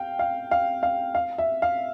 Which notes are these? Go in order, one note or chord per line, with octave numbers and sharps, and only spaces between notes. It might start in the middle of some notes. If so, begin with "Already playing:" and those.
Already playing: F5 G5
F5
F5
F5
F5
E5
F5